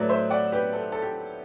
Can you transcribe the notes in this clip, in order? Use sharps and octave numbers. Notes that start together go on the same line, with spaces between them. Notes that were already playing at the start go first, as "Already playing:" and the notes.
Already playing: A2 F#3 A3 B4 D5
C5 E5
D5 F#5
G4 B4
A4
A4
G4